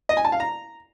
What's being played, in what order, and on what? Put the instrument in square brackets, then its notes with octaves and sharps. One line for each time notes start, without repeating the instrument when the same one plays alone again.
[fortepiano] D#5
G#5
A5
F5
A#5